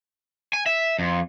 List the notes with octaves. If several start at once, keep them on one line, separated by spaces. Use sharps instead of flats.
G#5
E5
F2